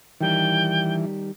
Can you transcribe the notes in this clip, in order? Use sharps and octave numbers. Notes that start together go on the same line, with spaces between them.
D#3 E3 G3 D#4 G5